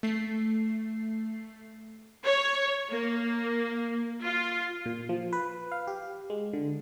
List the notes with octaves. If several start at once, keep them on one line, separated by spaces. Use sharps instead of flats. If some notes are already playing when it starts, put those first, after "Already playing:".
A3 C7
C#5
A#3
F4
A#2
F3
B4
F5
G4
G#3
D3